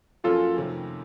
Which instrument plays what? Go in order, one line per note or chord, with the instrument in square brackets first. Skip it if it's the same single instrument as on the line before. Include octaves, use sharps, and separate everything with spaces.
[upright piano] F#2 F3 A#3 C#4 F#4 [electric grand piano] F4 A4
[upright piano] F2 C3 D#3 A3 C#4